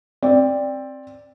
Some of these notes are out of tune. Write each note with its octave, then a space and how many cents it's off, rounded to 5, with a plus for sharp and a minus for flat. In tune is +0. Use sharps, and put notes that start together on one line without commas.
C4 +15 D5 +0